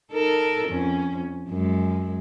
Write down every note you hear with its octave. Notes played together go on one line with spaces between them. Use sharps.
D#4 A4 A#4
F2 C#4
F#2 G#3